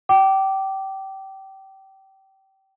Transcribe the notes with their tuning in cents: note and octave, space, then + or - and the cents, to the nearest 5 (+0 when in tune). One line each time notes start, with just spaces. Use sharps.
G5 -25 D6 +0